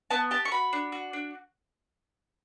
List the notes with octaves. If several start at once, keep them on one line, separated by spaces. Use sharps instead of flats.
B3 A5
G4 A5
C#6
F#4 B5
D4
F#4
D4